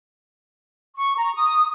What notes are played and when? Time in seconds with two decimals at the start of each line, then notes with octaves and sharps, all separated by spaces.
0.96 C#6
1.17 A#5
1.35 D#6